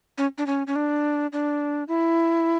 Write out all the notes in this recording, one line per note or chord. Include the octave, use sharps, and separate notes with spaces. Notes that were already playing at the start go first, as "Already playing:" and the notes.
C#4
D4
C#4
C#4
D4
D4
E4